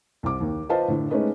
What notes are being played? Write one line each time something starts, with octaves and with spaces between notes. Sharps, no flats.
C2 D6
D#2
F4 B4 C5 D#5 F5 A5
A2 D3
G#3 A3 C#4 D#4 B4 D#5